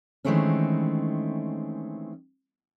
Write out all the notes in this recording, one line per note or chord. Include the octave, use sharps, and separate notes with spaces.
D#3 E3 G#3 A3 C4 C#4